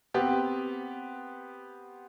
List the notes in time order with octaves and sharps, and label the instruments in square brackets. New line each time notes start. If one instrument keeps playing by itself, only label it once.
[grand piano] B3 C4 G4